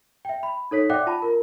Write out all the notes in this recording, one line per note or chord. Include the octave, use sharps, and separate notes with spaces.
E5 G5
B5
D#4 A4 C#5 B6
D5 E5 F#5 G5 D6 F#6
F4 A5 B5
F4 A#4